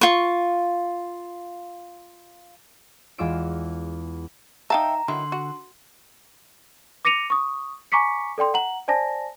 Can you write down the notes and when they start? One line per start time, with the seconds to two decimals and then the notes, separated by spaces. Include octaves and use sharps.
0.01 F4 C#6
3.18 E2 G#3 F4 D6 E6 D7
4.70 D#4 E5 F5 G5 A5 A#5
5.08 D3 D#3 F#3 E4 C6
5.32 F#4
7.05 D6 A#6 C#7 D#7 F7
7.30 C#6 D#6
7.92 G#5 A#5 C#6 D6 B6 C#7
8.38 A4 D5 G5 C6
8.54 F#5 A#5 F#7
8.88 C5 D5 G#5 A5 A#6